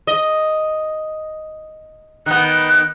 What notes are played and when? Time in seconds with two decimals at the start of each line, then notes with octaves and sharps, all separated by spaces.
0.07 D#5
2.26 D#3 B3 F#6